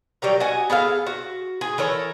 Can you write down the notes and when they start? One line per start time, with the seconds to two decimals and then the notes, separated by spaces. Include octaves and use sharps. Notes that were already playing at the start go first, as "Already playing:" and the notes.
0.22 F#3 G3 G4 A#4
0.40 F#4 D#5 G#5
0.70 B3 G#4 A4 F5
1.07 F#4
1.61 G#4 G#5
1.78 E3 A4 A#4 C#5